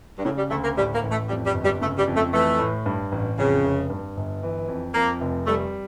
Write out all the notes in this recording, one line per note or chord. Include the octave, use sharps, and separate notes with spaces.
G2
A2 C#3
G3
D2 A3
A#3
A2 G3
A#3
A1
A3
F2 G3
G3
G1
G3
C#3 A3
G3
F2
A3
E3 A3
A2
G2
A1
F2 C#3
F1
G2
G1
E3
F2
F2 A#3
F1
G3 A3